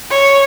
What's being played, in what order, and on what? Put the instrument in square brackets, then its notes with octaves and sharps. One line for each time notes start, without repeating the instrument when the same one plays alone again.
[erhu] C#5